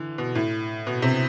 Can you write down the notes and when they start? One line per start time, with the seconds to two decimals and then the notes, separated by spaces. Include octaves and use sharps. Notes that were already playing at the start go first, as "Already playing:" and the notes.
Already playing: D3 E3
0.18 B2
0.35 A2
0.87 B2
1.02 C3